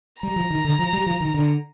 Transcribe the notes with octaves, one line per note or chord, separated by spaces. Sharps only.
G3 A#5
F3
D#3
D3
F3
G3
F3
D#3
D3